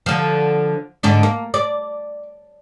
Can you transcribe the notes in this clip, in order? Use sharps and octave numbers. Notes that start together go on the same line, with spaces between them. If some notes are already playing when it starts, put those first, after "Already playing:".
D3 F3
G#2 D3 D4
A#3
D5